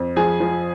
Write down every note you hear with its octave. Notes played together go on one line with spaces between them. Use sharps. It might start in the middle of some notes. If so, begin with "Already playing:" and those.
Already playing: F2
F3 G#4 G#5
F3